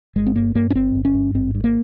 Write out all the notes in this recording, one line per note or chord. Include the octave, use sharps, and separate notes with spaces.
G1 G#3
C4
G2 A#3
G2 A#3
C#4
G1 C4
G1
C#4
G2
G#1 C4
G2
A#3